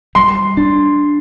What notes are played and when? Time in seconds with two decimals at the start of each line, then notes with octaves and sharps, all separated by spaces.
0.15 G3 C6
0.57 D4